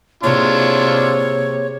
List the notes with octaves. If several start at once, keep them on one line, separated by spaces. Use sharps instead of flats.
C3 A#3 D4 E4 F4 G#4 C#5 D6